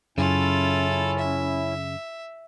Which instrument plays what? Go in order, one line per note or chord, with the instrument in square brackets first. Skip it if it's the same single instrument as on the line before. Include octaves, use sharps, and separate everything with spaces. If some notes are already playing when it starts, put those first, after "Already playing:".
[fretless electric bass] F#2 [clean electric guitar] C#3 [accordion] C#4 E4 [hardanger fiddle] F4 A4
[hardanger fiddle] E5